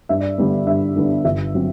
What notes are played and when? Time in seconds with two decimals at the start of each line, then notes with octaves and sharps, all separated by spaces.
0.09 G2 E5
0.20 D5
0.38 D3 G3 B3 D4 D5
0.67 G2 E5
0.96 D3 G3 B3 D4
1.25 G1 E5
1.55 F#3 C4